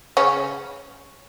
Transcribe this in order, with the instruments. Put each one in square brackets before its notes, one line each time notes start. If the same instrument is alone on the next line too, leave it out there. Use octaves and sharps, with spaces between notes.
[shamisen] C#3 C#4